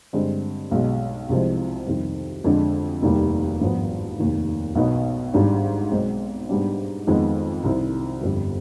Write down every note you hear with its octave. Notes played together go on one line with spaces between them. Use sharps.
G2 D3 G#3 C4
B1 B2 G#3
C2 C3 F3 G#3
F2 C3 D#3 G3 C4
F2 D3 G#3 D4
F1 D#2 D#3 G3
G#1 G2 F3 B3
F1 D#2 D#3
B1 B2 B3 D#4
G#1 G#2 G3 D4
B1 B2 G#3 C4
G#2 G3 B3 D4
F2 D#3 G#3 B3
C2 C3 D#3
G1 F2 D3 G3